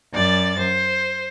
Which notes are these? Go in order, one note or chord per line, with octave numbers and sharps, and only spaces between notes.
F#2 D5 A6
C5